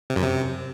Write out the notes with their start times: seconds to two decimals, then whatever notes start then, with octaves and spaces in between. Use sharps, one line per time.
0.10 C3
0.16 F#2
0.23 C3